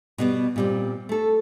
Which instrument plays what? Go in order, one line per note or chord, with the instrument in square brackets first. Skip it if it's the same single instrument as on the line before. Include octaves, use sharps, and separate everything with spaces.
[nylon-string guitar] B2 G3 B3
A#2 G3 C4
A3 A4